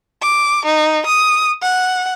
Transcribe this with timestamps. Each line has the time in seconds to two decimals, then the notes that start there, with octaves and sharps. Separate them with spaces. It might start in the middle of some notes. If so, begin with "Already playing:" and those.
0.22 D6
0.66 D#4
1.07 D#6
1.63 F#5